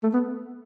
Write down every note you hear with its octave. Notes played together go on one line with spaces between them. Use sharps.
A3
B3